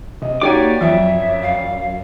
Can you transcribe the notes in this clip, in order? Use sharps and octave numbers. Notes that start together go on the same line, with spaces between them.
C3 D#5
A#3 D#4 F#4 G4 C#5 D5 D6 D#7
F2 F#3 E5
F#2
F5